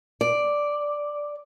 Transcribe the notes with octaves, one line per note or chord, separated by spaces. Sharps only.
D5